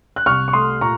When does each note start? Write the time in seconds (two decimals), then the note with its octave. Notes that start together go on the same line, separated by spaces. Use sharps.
0.16 F#6
0.26 C2 C#6 F6
0.48 C#6
0.53 A3 C6 D#6
0.81 A#2 A#5 C#6